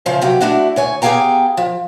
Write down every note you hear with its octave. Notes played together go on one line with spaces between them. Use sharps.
C#3 F3 C5 E5
C3 F#3 G4
A3 D4 E4 F#4
D2 C#5 G#5
B3 G4 G#4 F5 G5 A#5
F3